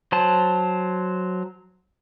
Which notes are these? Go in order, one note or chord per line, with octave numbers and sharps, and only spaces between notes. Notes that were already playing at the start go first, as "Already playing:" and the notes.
F#3 C5 A5